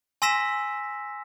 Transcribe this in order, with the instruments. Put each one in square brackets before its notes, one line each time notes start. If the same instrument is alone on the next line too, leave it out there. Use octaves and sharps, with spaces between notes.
[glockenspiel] G#5 C6 E6 A#6 B6 E7